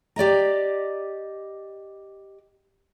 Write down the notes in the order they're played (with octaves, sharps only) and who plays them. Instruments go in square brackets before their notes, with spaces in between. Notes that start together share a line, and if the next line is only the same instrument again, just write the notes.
[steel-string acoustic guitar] G4 D5 D#5 A#5